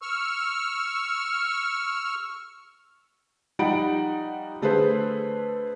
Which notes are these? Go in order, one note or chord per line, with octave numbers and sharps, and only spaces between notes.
C#6 E6 F6
F3 G3 D#4 F#5 B5 D7
D3 A3 G#4 B4 C5